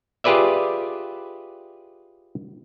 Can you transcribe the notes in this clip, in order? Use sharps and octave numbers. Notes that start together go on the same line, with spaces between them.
F4 G4 G#4 B4 D5 E5